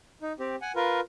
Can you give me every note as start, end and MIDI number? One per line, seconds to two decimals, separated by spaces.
0.22 0.33 63
0.39 0.56 60
0.39 0.56 67
0.62 0.72 78
0.62 0.72 80
0.75 1.00 65
0.75 1.00 70
0.75 1.00 71